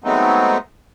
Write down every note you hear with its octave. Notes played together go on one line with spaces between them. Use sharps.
F#3 G#3 A3 B3 C4 D#4